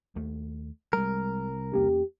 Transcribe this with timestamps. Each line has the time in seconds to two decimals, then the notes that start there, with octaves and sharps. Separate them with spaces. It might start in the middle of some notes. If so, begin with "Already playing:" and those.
0.16 D#2 A3
0.93 C2 G3 G#3 A#4
1.73 E2 A#3 C#4 G4